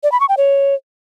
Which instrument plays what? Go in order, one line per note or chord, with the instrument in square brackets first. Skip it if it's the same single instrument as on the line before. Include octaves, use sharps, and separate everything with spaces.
[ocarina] D5
B5
C#6
G5
C#5